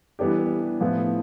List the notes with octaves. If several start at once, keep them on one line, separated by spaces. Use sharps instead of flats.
E3 G3 B3 D4 G4
A2 F3 B3 E4